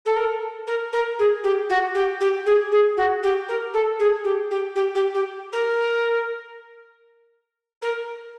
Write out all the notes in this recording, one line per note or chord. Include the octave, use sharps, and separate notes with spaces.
A4
A#4
A#4
A#4
G#4
G4
F#4
G4
G4
G#4
G#4
F#4
G4
A#4
A4
G#4
G4
G4
G4
G4
G4
A#4
A#4